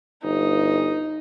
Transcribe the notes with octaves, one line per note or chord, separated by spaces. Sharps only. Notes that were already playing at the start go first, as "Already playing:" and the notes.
G1 D#4